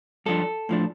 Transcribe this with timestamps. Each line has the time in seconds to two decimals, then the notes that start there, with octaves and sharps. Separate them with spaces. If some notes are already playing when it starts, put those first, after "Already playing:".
0.26 G2 F3 D4 A4
0.69 A2 F3 D4